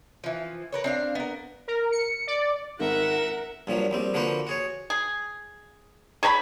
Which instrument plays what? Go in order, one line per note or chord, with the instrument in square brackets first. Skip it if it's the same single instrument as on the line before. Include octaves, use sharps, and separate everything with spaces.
[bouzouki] E3 F3
A#4 B4 C#5
C4 D4 F5
B3 A#4
[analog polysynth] A#4
C#7
D5
[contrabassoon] G#1 [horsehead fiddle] A#4 F#5 [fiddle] E5
[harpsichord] G2 A#2 F3 F#3
A#1 G3 C4
D3 F3 A#3 F#4 B4 C5
F#4 G#4 C#5
[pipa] G#4
G#4 C#5 A#5 B5